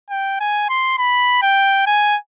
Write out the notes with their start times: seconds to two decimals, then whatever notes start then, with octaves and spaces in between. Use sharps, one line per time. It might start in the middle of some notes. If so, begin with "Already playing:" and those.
0.10 G5
0.40 G#5
0.69 C6
0.98 B5
1.42 G5
1.87 G#5